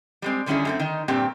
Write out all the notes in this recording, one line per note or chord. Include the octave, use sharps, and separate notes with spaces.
G3 G#3 C4
D3 D#3 G3 C#4 E4 G#4
F#2 A3 C4
D#3 D#4
G2 A#2 C4 G4